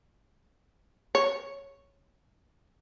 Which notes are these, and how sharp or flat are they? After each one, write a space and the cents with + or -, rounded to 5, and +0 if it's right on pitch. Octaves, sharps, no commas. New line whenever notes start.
C#5 +0